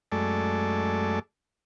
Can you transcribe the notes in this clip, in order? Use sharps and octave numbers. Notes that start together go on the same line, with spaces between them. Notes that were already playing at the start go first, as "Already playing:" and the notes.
F#2 G#3 A3 A4 D5